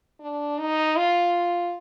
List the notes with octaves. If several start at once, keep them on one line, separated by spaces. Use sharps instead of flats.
D4
D#4
F4